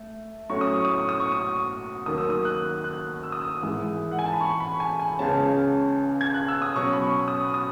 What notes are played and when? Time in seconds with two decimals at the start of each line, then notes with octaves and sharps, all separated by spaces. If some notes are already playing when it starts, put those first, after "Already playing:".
Already playing: A3
0.50 A2 F#3 C#4 C#6
0.61 D#6
0.73 C#6
0.85 D#6
0.96 C#6
1.09 D#6
1.20 C#6
1.32 D#6
1.44 C#6
2.06 D#2 D#3 F#3 D#6
2.18 E6
2.30 D#6
2.45 F#6
2.84 F#6
3.23 E6
3.32 D#6
3.41 E6
3.62 G#2 E3 G#3
4.11 F#5
4.19 G#5
4.26 A5
4.33 B5
4.41 C#6
4.60 B5
4.80 G#5
5.00 G#5
5.19 C#2 C#3 G#3 C#4 A5
6.21 G#6
6.34 F#6
6.48 E6
6.62 D#6
6.76 B2 F#3 C#4 C#6
6.93 B5
7.01 C#6
7.28 D#6
7.54 D#6